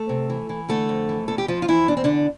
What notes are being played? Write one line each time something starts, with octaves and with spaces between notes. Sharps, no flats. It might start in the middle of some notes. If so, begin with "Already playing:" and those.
Already playing: A3 A4
C3
E3
E3
D3 A3 A4
F2
E3
E2 A4
G4
F2 F3 F4
F4
F2 E3 E4
E2 D4
C4
E2 D3 D4